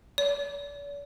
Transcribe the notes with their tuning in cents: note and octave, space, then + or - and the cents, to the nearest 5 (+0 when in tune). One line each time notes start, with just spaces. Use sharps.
D5 -45